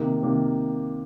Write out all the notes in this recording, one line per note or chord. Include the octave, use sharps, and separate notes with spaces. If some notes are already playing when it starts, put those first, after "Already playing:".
Already playing: C3 D#3 A#3
C3 D#3 A#3